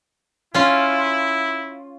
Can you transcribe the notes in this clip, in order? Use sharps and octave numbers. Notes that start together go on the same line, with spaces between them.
C#4 E4 F4